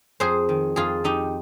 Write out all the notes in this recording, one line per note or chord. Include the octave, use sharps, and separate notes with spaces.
F2 G#4 C5
D#3
F2 F4 G#4
F2 D#4 G4